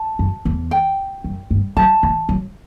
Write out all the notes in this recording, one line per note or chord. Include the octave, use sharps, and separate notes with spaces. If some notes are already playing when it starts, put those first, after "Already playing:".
Already playing: A5
F#2
E2
G5
F#2
G2
F#3 A5
E3
F#3